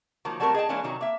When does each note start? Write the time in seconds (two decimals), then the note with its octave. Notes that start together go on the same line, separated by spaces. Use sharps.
0.25 D#3 F3 F#3 A#3
0.40 F#3 G3 A3 C4 A4 A#4
0.54 G#4 D#5 G5 A5
0.69 E3 G#3 A#3 C#4 D4
0.84 C3 D#3 F#3
1.01 A#3 E5